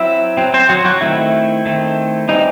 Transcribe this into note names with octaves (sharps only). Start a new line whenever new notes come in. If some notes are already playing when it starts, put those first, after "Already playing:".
Already playing: F#3 C4 E4 E5
F#3 C4
C4 C5
F#3 F#4
F#3 F#4
D#3 A3 C4 E4
D#3 A3 C4
E3 G3 C4 D#4